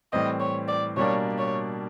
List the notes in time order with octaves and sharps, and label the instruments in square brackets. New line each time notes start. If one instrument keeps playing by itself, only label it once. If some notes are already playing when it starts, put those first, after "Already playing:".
[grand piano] A2 E3 G3 C4 [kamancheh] D#5
[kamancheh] C#5
D5
[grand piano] B2 G3 A#3 D4 [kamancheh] C#5
[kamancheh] C#5